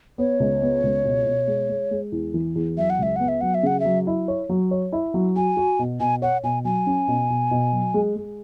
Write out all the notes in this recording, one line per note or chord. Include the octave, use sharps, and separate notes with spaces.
B3 C#5
C#2
B3
C#2
B2
B2
G#3
G#3
G#3
E2
E3
E2
F#3 E5
F#5
C#2 E5
B3 F#5
E5
F#3 F#5
E5
C#3 F#5
F#3 E5
E4
C#5
F#3
C#5
E4
F#3
F#4 G#5
F#4
B2
B2 G#5
C#5 F#5
B2 G#5
F#3 G#5
C#4
B2
B2
B2
F#3
G#3
G#3